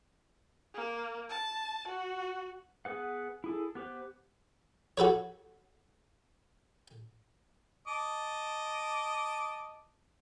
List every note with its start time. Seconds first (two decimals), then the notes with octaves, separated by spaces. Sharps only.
0.74 A#3
1.30 A5
1.88 F#4
2.85 B3 G#4 B4 F#5
3.44 E4 G#4 A4
3.75 B3 G4 B4 C5
4.98 F#4 A4 B4 C#5
7.88 D#5 A5 D6